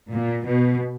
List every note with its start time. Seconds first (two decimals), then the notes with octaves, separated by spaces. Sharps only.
0.14 A#2
0.47 B2